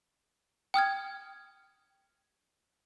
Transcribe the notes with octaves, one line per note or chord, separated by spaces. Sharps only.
G5 D#6 F6 G#6